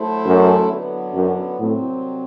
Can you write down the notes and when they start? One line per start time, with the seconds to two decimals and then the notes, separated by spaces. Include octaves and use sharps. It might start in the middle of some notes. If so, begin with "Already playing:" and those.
Already playing: F#3 A3 E4 A4 C5
0.26 F#2
0.70 D3 F#3 B3 E4
1.15 F#2
1.59 C2 A2 C3 F#3 C4